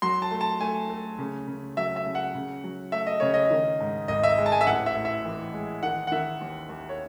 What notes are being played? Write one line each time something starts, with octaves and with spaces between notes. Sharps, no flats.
F#3 C6
A5
A3
A5
A3 G#5
A3
C#3
C#3
F#3 E5
E5
C#3
F#5
C#3
F#3
A3 E5
D#5
C#3 C#5
D#5
D#3
G#2
G#1 D#5
E5
G#3
A5
G#5
E5
A1 F#5
E5
A2
E5
E3
G#3
D#3 F#5
F#5
D#3 E5
D#2
D#2
C#5